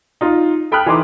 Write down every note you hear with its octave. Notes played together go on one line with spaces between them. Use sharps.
D#4 F4
A4 G5 B5 D#6 F6 F#6
E3 D#4 C6 D6